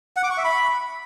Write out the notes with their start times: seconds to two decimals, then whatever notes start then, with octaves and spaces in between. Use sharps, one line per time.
0.17 F#5
0.24 D6
0.30 C#6
0.37 E5
0.44 B5